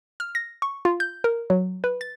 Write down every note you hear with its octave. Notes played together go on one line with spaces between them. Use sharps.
F6
A#6
C#6
F4
G6
A#4
F#3
B4
A6